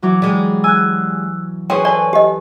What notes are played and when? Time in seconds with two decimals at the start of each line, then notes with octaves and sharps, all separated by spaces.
0.02 E3 F#3 D6
0.22 G3 G#3
0.64 G#5 E6 F#6
1.70 F#3 C#4 G#4 B4 C5 G5
1.85 A4 B4 D5 G#5
2.13 G4 D#5